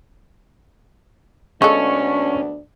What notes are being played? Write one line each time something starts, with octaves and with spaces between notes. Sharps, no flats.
D2 G#3 B3 C#4 D4 F4 A4 C#6